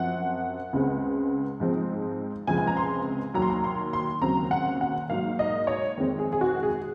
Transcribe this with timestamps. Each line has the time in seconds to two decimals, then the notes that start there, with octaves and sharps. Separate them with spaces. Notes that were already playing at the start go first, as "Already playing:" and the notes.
Already playing: F#2 F3 C4 F#5
0.73 C#2 C#3 G#3 C4
1.60 G#2 F3 G#3 C4
2.47 C#2 C3 F3 G#3 C4 G#5
2.58 G#5
2.67 A#5
2.77 C6
3.34 D#2 D#3 F#3 A#5
3.42 C6
3.50 A#5
3.64 C6
3.93 C6
4.22 D#2 C#3 F#3 C4 A#5
4.51 F#5
4.81 F#5
5.09 G#2 F#3 A#3 F5
5.39 D#5
5.67 C#5
5.97 F2 D#3 G#3 C4
6.19 G#4
6.33 G#4
6.41 F#4
6.63 G#4